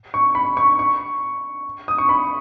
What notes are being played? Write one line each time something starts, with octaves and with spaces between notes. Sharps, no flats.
C#6
B5
C#6
C#6
D#6
C#6
B5